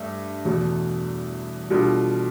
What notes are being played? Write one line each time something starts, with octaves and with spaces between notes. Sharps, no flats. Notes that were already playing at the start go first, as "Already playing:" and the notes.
Already playing: G2 A3
E2 B2 A3
B2 G3 D4 F4 A4